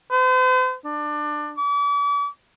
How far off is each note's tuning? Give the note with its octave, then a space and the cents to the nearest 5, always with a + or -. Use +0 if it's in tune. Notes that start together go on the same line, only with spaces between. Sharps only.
C5 -45
D4 +20
D6 -40